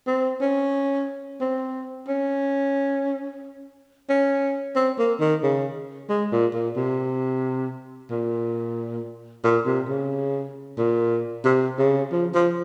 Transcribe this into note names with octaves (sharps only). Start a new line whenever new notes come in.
C4
C#4
C4
C#4
C#4
C4
A#3
D#3
C#3
G#3
A#2
A#2
C3
A#2
A#2
C3
C#3
A#2
C3
C#3
F3
F3